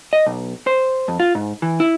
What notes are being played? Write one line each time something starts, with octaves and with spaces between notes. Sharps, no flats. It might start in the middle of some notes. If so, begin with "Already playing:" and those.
D#5
B1
C5
F2
F4
G#2
E3
E4